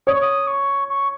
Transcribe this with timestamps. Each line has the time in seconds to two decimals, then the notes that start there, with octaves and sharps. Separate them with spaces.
0.07 C#5 D#6
0.15 C#6
0.21 D#6
0.47 C#6
0.89 C#6